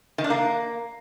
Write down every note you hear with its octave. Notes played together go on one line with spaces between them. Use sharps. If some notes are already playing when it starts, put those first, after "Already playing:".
D#3
D4
A#3